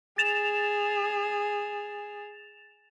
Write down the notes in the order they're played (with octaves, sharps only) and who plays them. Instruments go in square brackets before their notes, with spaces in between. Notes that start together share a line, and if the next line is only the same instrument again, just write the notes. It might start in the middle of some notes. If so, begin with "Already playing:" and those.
[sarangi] G#4 [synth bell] A6 E7 F7